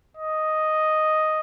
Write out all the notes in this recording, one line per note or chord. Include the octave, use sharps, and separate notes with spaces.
D#5